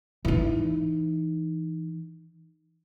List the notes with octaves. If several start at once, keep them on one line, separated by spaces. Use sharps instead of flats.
E3 D#4